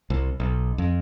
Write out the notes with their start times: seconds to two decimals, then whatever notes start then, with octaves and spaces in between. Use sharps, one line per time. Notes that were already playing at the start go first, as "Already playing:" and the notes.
0.10 C2
0.40 B1
0.78 F2